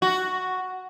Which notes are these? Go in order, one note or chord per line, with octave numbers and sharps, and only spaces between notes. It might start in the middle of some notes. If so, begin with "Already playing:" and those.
F#4